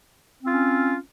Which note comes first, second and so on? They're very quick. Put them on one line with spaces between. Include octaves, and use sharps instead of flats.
C4 F4 C#4